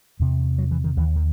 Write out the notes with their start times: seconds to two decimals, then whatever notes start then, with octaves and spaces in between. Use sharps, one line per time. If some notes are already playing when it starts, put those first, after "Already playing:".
0.20 E2 C3
0.58 F#3
0.71 E3
0.84 D#3
0.97 D#2 E3
1.16 D#3